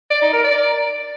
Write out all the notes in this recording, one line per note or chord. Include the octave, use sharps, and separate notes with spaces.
D5
D#4
A#4
D5